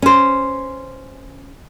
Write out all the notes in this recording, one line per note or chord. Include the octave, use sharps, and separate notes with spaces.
C#4 C5